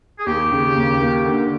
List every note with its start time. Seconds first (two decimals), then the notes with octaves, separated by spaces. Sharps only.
0.17 G#4
0.26 D#2 G4
0.51 C#3
0.76 D#2
1.00 A#3
1.25 D3